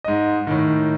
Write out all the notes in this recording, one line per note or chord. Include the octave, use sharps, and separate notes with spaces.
G#2 D#5
A2 D#3